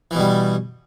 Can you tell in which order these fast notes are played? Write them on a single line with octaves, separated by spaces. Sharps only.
E3 B2 G3